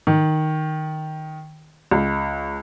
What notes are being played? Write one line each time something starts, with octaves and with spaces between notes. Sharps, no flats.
D#3
C#2